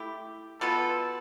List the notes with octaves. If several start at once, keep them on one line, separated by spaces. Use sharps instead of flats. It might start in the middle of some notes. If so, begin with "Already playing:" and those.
Already playing: A3 E4 G4
B2 B3 F4 A4 B4